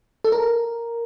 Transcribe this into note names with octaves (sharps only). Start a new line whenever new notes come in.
A4
A#4